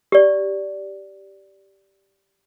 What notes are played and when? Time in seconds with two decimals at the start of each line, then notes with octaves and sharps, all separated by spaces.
0.12 G4 D5